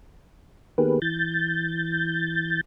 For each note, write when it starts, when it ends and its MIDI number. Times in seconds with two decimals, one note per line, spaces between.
0.78 0.99 51
0.78 0.99 58
0.78 0.99 59
0.78 0.99 67
0.78 0.99 68
0.78 0.99 71
1.02 2.61 52
1.02 2.61 91
1.02 2.61 93